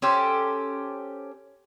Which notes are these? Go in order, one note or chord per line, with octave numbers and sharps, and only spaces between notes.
C#4 G4 A4 C5